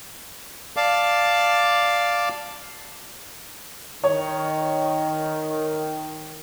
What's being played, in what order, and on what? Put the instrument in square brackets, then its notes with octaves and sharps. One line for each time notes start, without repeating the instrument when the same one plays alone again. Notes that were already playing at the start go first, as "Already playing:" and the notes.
[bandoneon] D5 F5 A5 D6
[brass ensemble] D#3 [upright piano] C#5